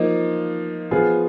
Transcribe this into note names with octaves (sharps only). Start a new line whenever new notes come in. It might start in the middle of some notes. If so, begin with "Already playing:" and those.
Already playing: F3 A#3 D#4
F3 B3 F4 G#4